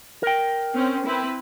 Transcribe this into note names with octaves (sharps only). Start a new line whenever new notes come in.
A#4 G5
C4 C#4
C4 E4 B4